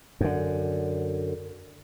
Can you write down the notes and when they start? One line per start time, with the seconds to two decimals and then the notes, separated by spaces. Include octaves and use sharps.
0.21 F#2 D3